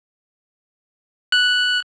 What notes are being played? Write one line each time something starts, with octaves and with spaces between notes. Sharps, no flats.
F#6